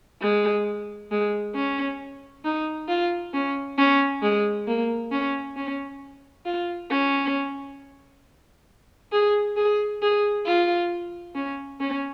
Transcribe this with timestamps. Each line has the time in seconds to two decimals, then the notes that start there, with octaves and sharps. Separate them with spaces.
0.22 G#3
1.11 G#3
1.55 C#4
2.45 D#4
2.88 F4
3.34 C#4
3.78 C#4
4.22 G#3
4.67 A#3
5.12 C#4
5.56 C#4
6.45 F4
6.90 C#4
9.12 G#4
9.57 G#4
10.02 G#4
10.46 F4
11.35 C#4
11.80 C#4